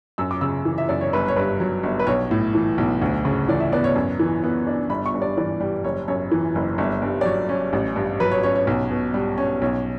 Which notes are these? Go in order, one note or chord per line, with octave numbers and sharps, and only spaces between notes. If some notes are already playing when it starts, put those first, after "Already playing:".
F#2 E6
D6
C#3 E6
E3
E5
F#2 D5
C#5
G1 B4
C#5
G2 B4
F#3
G1
B4
B1 C#5
A2
E3
B1
D2
C#3
E3 D5
E5
B3 D5
C#5
F#2
E3
B3
D4
G1 B5
C#6
G2
D5
E3 D5
G3
F#1 C#5
F#2 C#5
E3
F#1
G1
G2
D5
F#3 C#5
C#4
A1
G2
F#3 B4
C#5
C#4 C#5
C#5
B1
B2
G3
C#4
B1 C#5